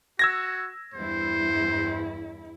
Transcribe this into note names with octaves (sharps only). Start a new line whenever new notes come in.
F#4 E6 G#6 A#6
E2 G2 E4 C5